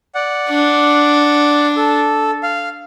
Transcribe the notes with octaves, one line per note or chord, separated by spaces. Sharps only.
D5 F#5
D4
A4
F5